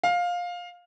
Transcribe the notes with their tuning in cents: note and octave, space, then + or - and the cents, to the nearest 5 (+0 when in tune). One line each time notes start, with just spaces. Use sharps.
F5 +15